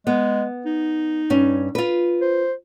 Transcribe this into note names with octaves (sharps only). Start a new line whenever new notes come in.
G#3 B3
D#4
G2 C#4
F4 B4
C5